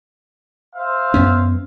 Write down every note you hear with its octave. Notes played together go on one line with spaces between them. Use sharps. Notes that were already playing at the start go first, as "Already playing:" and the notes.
C5 E5 F5
F#2 B3 C#4